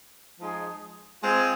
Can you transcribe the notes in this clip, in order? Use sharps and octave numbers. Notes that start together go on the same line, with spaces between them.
F3 G#3 D#4 G#4
G#3 C4 F4 G#4